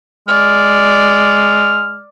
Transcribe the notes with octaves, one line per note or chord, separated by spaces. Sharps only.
G#3 D5 F6